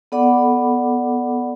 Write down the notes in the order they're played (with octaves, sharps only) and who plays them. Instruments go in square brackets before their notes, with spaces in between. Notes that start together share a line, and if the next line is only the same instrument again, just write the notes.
[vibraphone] B3 A4 D5 F#5 B5 D6